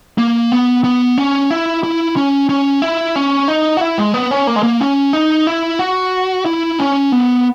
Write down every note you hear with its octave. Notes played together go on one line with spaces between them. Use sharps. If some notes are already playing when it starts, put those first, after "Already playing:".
A#3
B3
B3
C#4
E4
E4
C#4
C#4
E4
C#4
D#4
F#4
E4
G#3
B3
C#4
A#3
G#3
A#3
C#4
D#4
E4
F#4
E4
C#4
B3